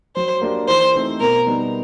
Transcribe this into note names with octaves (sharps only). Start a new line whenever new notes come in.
F#3 C5
A#3 D4 G4 A#4
E3 C5
A3 C4 D#4
B2 A#4
G3 B3 D#4